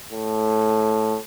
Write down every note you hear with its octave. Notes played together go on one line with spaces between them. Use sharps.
A2